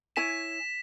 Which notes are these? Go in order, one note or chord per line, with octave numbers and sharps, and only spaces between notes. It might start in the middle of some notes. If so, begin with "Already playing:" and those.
E4 C#5 G#5 B6 E7